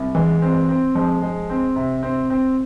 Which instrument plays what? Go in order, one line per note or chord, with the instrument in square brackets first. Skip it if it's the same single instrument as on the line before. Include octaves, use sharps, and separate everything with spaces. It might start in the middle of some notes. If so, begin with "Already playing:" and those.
Already playing: [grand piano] C2
[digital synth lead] E3 [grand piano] G#3
[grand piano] C4
C4
[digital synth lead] F3 [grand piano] G#3
[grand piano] G#3
C4
C3
C4
C4